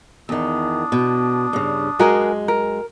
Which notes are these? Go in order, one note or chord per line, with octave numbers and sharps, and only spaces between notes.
E2 D#3 D4 D#6
B2
G2 C#3
F#2 G#3 F#4 G#4 A#4
A#4